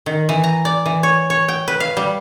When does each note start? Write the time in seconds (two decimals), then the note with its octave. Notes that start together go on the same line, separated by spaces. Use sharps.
0.06 D#3
0.29 E3
0.44 A#5
0.65 D5
0.86 E3
1.03 C#5
1.30 C#5
1.48 G5
1.68 B4
1.80 F5
1.97 G3